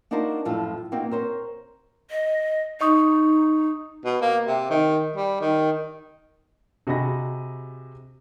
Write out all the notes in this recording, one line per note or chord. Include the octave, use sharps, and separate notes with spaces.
D4 D#4 F4 F#4 A#4 C5
F#2 A2 F3 F4 A4
A#3 C4 D#4 F4 F#4
A#4 C5 C#5
D#5
D#4 D#5 C#6 D#6
B2
A#3
C3
D#3
G3
D#3
C3 F#4 G#4 D#5 B5 A#6